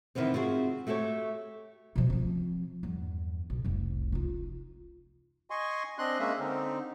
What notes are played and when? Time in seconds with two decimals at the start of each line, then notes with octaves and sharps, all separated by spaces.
0.15 C3 D#3 E3 B3 C4
0.34 C4 F4 F#4 G#4
0.87 A3 F#4 G4 A4 C#5
1.96 B2 F3
2.10 F3 C4
2.83 E2 G2
3.50 B1
3.64 F1 C2
4.12 D#4 F4
5.50 D#5 G#5 C6 C#6
5.98 C4 D4 D#5 C6 F#6
6.19 G#3 A#3 C#4 E5
6.39 D3 C4 D#4